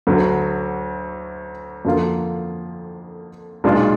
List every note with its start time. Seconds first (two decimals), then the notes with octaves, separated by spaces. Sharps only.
0.07 D2 D3 F#3
1.85 F2 D3 F3 A#3 F4
3.64 B1 A#2 G#3 D4 F4